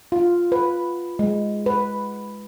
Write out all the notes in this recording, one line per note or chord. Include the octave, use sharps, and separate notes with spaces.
F4
B4
G#3
B4